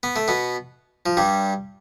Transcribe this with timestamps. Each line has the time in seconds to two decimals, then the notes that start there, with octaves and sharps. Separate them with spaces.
0.03 B3
0.16 A3
0.28 B2 B3
1.06 F3
1.17 G2 G3